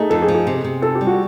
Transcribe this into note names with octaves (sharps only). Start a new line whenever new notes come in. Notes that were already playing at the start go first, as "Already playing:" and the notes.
Already playing: A3 D#4 G#4
F2 A4
G#4
F3
G#4
C3
C3
D#4 A4
G4
G3
F#4